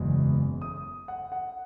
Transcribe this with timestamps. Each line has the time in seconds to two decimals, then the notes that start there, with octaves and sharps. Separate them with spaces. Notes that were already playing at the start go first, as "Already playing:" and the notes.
Already playing: F#1 E2 B2 G#3
0.62 D#6
1.08 F#5
1.32 F#5